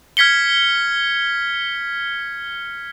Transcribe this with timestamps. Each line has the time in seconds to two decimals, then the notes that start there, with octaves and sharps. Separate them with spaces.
0.17 F6 G#6 B6 C#7 G7